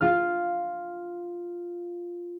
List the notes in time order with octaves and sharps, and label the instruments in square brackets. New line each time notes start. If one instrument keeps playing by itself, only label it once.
[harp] F4 F6